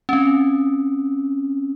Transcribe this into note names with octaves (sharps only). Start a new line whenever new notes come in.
C4 C#4